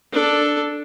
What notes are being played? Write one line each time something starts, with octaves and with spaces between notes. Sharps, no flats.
D4 A4